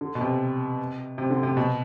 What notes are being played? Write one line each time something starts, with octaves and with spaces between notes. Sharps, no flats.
D3
B2
C3
C3
D3
C3
B2